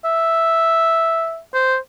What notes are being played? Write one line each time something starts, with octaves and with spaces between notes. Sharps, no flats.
E5
C5